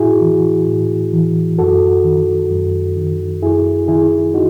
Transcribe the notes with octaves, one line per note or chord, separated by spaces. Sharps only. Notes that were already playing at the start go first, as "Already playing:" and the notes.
Already playing: A2 E4 F#4 G#4
E3
A2
E3
F#2 F#4 A4
D#3
F#2
D#3
F#2 E4 G#4
D#3 E4 G#4
D#4 F#4